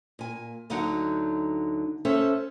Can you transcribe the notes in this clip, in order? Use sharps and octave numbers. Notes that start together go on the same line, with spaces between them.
A#2 G#5
D2 D3 F#3 D#4 F#5
C#4 A4 C5 E5